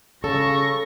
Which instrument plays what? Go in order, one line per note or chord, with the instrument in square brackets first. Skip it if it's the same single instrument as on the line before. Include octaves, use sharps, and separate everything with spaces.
[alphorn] C#3 [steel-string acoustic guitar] A4 [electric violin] C#6 A#6